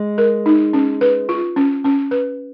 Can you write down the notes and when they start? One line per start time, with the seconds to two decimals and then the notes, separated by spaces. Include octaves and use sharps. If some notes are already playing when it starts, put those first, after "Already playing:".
Already playing: G#3
0.18 A#4
0.46 D#4
0.73 C#4
1.01 B4
1.29 F4
1.56 C#4
1.84 C#4
2.11 B4